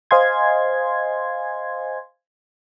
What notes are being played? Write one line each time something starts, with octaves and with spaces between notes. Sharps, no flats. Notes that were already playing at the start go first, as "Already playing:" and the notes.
C5 D#5 F5 G#5 C6 G#6